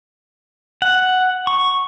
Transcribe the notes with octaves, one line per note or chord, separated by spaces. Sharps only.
F#5
C#6